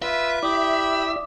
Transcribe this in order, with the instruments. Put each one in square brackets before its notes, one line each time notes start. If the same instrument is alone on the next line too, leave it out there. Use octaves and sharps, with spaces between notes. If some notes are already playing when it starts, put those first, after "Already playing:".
[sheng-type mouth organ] F4 B4 [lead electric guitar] E5
[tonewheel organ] E4 D5 [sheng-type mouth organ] G4 B5 [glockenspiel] D6 D#6